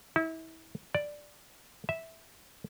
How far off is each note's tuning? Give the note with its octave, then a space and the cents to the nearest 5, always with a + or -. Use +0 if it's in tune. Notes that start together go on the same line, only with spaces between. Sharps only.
E4 -30
D5 +5
E5 -10